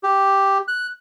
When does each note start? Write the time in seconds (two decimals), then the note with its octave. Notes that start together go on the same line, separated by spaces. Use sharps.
0.03 G4
0.68 F#6